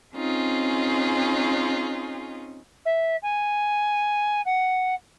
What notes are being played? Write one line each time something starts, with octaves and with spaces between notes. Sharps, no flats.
C4 C#4 D#4 F4 G#4
E5
G#5
F#5